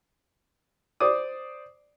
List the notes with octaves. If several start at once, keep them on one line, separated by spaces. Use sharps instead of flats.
C5 D5 D6 D#6